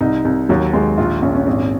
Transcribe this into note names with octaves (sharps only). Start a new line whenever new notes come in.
C2 D#4
C2
D#2 F#3
D#2 G#3
A#1 F4
A#1 C#4
C#4
G#1